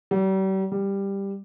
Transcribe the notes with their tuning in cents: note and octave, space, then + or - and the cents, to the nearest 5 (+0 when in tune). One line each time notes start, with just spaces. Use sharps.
G3 -40
G3 +10